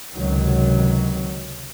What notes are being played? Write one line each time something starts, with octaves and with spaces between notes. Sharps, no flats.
C#2 C3 D#3 F#3